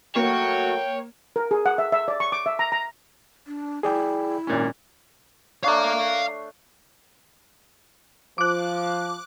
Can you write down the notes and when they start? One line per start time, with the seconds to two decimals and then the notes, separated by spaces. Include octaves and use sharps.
0.16 F#3 A3 A#3 F#4 C#5 G5
1.36 A#4
1.51 G#4
1.66 F#5
1.78 E5
1.92 E5
2.08 D5
2.20 C#6
2.32 D6
2.46 E5
2.59 A#5
2.72 A#5
3.47 D4
3.83 E4 G#4 D5 G5
4.47 G#1 A#2 C#4
5.64 A3 D4 C#5 F5 A#5
8.38 F3 D6 F#6